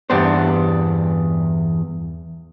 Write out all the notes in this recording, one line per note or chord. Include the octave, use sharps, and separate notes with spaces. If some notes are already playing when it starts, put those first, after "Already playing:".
E2 G2 B3 D4 C5